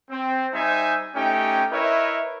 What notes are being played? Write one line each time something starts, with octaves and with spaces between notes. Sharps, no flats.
C4
G3 D#4 C5 E5 G#5
A3 C#4 D#4 G4 G5
E4 A#4 B4 C#5 D#5 E5